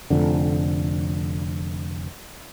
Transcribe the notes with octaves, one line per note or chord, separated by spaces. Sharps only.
F1 A#1 F2 D3